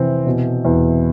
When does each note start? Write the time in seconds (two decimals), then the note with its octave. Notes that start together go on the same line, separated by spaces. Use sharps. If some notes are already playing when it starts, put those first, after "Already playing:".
Already playing: F1 F2 C3 E3 C4
0.27 B2
0.65 E2